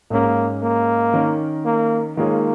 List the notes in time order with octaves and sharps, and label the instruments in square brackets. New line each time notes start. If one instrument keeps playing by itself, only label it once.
[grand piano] G#2 G#3 C#4 G#4 [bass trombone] A#3
[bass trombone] A#3
[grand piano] D#3 C#4 A#4
[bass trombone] A#3
[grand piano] D#3 G#3 F4 G#4 C#5 [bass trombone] A#3